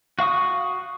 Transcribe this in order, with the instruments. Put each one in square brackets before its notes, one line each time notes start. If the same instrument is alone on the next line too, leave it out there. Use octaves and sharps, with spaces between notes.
[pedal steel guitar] F#4 F5 C#6 D#6